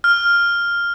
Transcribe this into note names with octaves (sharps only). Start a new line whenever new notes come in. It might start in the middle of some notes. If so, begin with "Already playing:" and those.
F6